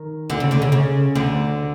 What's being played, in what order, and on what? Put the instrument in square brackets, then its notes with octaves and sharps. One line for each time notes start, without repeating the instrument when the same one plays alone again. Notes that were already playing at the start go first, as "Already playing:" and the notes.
Already playing: [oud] D#3
D2 D3
C#3
D2 D3
C#3
C#3
D2 D3